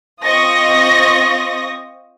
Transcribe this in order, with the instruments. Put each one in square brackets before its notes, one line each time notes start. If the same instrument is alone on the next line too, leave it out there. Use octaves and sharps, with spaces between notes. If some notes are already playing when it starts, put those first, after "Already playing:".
[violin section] C4 F4 D#5 C#6 D#6 A#6